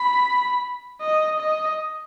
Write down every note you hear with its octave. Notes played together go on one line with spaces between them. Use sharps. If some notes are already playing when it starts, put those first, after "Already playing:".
Already playing: B5
D#5
D#5